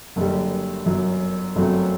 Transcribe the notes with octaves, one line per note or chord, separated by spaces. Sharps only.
F#1 F#2 D3 G3
G1 F#2 F#3
G1 F#2 F#3 A3 C4